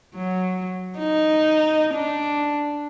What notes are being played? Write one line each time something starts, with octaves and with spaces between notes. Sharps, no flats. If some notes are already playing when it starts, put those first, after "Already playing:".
F#3
D#4
D4